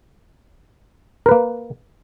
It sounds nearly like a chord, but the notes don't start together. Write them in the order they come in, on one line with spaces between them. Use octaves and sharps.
A#4 B4 A#3